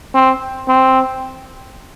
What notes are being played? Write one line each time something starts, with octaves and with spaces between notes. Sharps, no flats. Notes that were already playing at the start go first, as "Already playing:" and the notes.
C4
C4